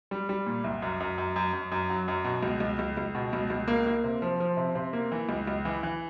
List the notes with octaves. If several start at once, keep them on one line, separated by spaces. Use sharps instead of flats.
G3
G3
A#2
C2
F#2
F#2
F#2
F#2
F#2
F#2
F#3
F#2
B2
C#2
C#2
C#2
C#2
B2
C#2
C#2
A#3
A#3
C3
F3
F3
C3
C3
A#3
E3
C#2
C#2
E3
E3